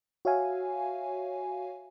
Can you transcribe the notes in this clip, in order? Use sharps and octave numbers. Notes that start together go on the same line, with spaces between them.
F#4 C#5 E5 F5 G#5